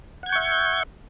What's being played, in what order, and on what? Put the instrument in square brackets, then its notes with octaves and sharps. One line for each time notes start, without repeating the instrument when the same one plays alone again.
[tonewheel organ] F#5
G#6
G6
C#6
E5